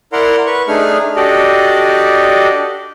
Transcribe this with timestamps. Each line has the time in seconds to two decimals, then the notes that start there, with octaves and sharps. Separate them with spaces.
0.13 E4 A#4 D5 F#5 A#5 C6
0.47 B4 C#6
0.68 A3 D4 D#4 G#4 F6
1.16 D4 F#4 G4 A4 D5 D#5